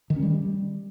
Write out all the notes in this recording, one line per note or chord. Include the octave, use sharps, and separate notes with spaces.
D#3
C#4
G3